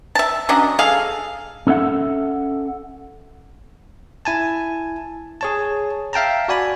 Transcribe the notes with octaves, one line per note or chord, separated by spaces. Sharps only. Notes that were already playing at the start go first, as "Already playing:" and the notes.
E5 A5
F#3 C#4 D4 D#5
G#4 A4 F5
C#4 A4 E5 F#5
E4 G#5 A5
G#4 C#5 A5
E5 F5 G5 A5 A#5
F#4 D5 G#5 B5